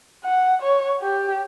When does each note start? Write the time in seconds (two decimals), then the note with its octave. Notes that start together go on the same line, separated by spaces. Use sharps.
0.25 F#5
0.62 C#5
1.02 G4